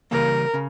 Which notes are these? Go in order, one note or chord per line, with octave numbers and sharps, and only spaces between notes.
C#3 E3 G3 A#3 A#4
C#3